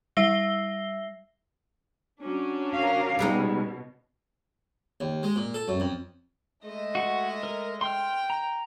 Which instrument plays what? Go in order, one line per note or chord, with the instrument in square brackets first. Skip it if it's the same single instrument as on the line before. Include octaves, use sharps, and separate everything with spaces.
[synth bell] G3 E5 E6 A#6 C7 G7
[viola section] F#3 C#4 D4
[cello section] A#4 F5
[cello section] B2 [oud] G3 G#3 D#4
[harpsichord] D#2
G#3
A#2
A4
F#2
F2
[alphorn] G#3 [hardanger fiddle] A3 D#5
[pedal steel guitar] F#4 F#5 C#6
A#4
[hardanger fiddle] G5 [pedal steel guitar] C6 F6
[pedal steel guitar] A#5